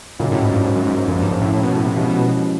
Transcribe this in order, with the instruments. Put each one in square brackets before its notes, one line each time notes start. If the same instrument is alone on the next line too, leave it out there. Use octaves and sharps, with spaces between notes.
[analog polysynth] A#2 [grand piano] C#3 F#3 A#3 D#4
[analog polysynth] A2
G#2
G2
G#2
F#2
G#2
G#2
[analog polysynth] F#2 [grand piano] F3 A#3 C#4 F4
[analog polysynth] G2
G#2
A2
A2
B2
A2
C3
[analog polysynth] B2 [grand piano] F3 G#3 C#4 E4 G4